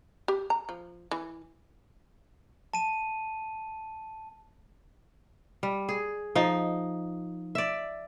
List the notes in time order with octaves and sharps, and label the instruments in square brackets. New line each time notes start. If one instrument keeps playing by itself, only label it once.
[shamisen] G4
A#5
F3
E3
[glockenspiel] A5 D#7
[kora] G3
G#4
F3 D#4
D5 E5